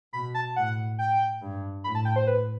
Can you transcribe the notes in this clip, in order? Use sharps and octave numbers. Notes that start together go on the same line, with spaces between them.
B2 B5
A5
A2 F#5
G5
G2
A2 B5
A5
G5
C5
B4